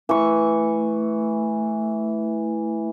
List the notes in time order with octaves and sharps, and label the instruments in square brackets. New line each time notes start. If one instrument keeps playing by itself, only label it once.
[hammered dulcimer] E3 C#6 [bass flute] A3